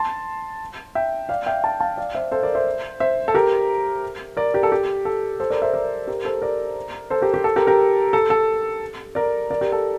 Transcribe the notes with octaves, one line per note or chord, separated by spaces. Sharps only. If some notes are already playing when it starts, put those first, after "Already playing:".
Already playing: A5 C6
E5 G5
D5 F5
E5 G5
F5 A5
F5 A5
D5 F5
C5 E5
A4 C5
A#4 D5
C5 E5
C5 E5
A4
G4 A#4
A#4 D5
G4 A#4
A4
G4
A4
A4 C5
A#4 D5
C5 E5
A#4 D5
G4 A#4
A4 C5
A#4 D5
A4 C5
G4 A#4
G4
A4
G4 A#4
G4 A#4
A4
A4
A#4 D5
A#4 D5
G4 A#4
A4